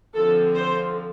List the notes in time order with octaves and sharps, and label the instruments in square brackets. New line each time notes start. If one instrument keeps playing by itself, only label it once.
[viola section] D3 F3 C4 A4
C5